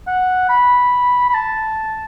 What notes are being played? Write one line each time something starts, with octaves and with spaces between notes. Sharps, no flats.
F#5
B5
B5
A5